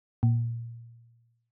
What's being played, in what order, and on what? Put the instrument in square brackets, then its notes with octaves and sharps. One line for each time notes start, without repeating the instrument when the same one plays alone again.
[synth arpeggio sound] A#2